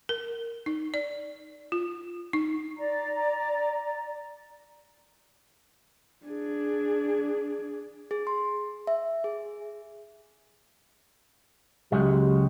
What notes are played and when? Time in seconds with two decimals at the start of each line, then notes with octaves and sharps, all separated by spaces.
0.09 A#4
0.66 D#4
0.94 D5
1.72 F4
2.33 D#4
2.77 D5 A#5
6.26 D4 G#4
8.11 G#4
8.27 C6
8.87 E5
9.24 G#4
11.92 C#2 F#3 G#3 G4